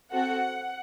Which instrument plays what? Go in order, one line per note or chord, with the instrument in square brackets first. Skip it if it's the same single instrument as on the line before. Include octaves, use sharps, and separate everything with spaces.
[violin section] C4 F#4 A4 F#5